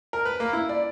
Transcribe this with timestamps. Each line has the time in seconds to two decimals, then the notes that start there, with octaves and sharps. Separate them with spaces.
0.13 A#4
0.25 B4
0.40 A#3
0.53 E4
0.69 D5